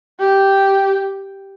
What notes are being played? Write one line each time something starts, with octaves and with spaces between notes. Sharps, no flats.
G4